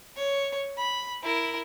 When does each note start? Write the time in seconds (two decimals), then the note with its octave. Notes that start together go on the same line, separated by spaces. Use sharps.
0.16 C#5
0.78 B5
1.23 E4 A#4